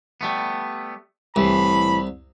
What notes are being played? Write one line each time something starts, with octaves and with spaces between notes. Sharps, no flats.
G3 A3 B3
C2 A2 E3 B5